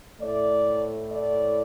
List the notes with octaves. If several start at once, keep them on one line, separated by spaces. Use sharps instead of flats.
A2 A3 D5
D5